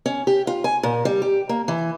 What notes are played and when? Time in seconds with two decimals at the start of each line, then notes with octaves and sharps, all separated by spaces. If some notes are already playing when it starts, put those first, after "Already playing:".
0.06 C#4
0.27 G4
0.47 F4
0.64 G#5
0.83 A#2
1.05 G3
1.22 G4
1.49 A#3
1.68 E3